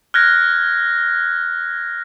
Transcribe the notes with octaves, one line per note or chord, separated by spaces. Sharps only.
F6 F#6 G#6 A#6